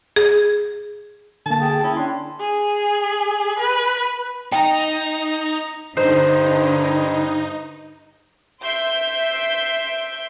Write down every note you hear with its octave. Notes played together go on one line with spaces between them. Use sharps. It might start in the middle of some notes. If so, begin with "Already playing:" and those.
G#4
D3 A#3 A5
G#4 G5
C#4 E4 G#5
D4 C6
G#4
B4
D#4 G5 A#5
G2 D3 D#4 C5
E5 C6 G6 D7